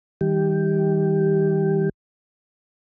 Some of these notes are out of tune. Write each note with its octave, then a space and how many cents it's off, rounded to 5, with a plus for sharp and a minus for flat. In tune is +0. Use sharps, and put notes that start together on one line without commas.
D#3 +40 G3 +10 G4 +0